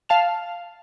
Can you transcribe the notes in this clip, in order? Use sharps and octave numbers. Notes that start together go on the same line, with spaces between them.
F5 A5 F6